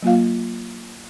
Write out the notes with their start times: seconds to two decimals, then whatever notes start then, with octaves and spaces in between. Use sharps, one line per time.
0.02 F#3 A#3 F4 F5